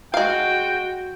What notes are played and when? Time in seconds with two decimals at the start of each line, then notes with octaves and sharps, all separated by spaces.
0.14 G#3 F#4 F5 G5